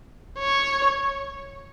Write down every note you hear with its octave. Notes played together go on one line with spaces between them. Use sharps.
C#5